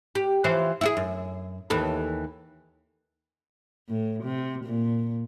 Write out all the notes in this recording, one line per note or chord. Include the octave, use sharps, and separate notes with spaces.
G4
E3 F3 C5
E4 F#4 G#4
F#2
D#2 E3 A4
A2
C3
A#2